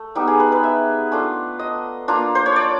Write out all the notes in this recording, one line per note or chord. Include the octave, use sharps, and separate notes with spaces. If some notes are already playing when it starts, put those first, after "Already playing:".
Already playing: A3
G3 B3 D#4 G4
G#4
B4
B4
E5
A3 D4 F4
D#5
A#3 D4 F4
C5
C#5
D5